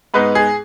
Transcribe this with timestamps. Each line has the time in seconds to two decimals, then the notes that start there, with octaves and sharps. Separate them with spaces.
0.14 G#2 G#3 B3 D#4 B4
0.35 G#4